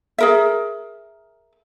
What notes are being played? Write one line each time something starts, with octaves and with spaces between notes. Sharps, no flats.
G#4 A#4 E5